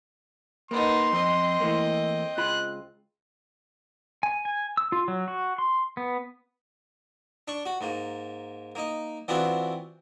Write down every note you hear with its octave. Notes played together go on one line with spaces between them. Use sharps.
A#3 B3 D#4 C6
F2 C4 D#5
E3 A3 A#3
C#2 F4 B5 F#6
G#5
G#5
E6
F4
F#3
F#4
C6
B3
D4 C#6
F#4
G#2 A#3
A#3 D#4
E3 B3 C4 D4 F4 F#4